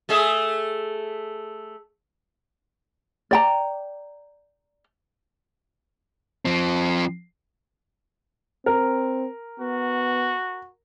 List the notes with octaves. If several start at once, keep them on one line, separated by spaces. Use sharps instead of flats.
A3 G#4 E5
D5 G5 A#5
F3 C4
C4 A#4
B3 F#4